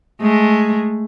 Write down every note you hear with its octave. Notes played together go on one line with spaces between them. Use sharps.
G#3 A3